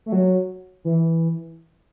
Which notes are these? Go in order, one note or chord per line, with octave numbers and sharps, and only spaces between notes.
A3
F#3
E3